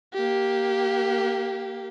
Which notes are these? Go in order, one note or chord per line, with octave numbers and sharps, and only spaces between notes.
A#3 G4